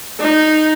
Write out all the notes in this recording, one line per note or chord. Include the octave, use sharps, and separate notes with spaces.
D#4